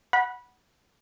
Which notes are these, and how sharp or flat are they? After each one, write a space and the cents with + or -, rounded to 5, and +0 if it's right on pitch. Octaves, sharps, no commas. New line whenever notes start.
F#5 +0 B5 -15